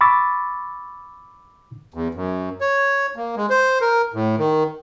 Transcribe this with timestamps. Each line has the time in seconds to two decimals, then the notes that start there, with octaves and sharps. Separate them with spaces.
0.01 B5 C#6 D6 E6 A6
1.94 E2
2.15 F#2
2.61 C#5
3.16 A#3
3.36 G#3
3.50 C5
3.81 A#4
4.14 A2
4.38 D#3